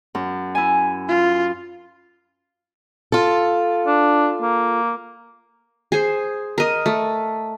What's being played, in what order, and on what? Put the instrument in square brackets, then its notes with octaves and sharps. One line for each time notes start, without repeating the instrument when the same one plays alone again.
[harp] F#2
E4 G#5
[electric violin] F4
[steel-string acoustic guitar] F4 A4
[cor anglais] D4
A#3
[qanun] G#4 C5
A#4 D#5
A3